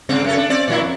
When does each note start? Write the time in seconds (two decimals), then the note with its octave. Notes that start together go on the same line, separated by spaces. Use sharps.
0.09 G#2 C#3 C4
0.24 F#2 C#4 A4
0.37 D4
0.49 C4 C#4 D5
0.68 A#2 F#3 E4
0.82 F2